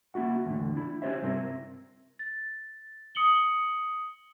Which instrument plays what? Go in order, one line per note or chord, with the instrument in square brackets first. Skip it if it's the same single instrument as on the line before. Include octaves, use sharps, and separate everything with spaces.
[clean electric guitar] A#3 C#4 E4 F#4 F#5
E2 A2 D3
D4 E4
C#4 G4 C5 C#5 E5
G2 C3 C4 E4 A#4
[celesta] A6
D#6 C#7 F#7 G7